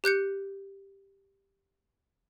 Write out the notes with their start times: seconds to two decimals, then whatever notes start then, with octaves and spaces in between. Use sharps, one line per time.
0.04 G4 F#6 G6 C#7